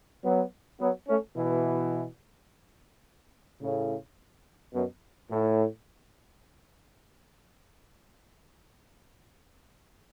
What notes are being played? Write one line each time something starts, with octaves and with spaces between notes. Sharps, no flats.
F#3 B3
F#3 B3
A3 C#4
B2 E3
A2 C#3
F#2 B2
A2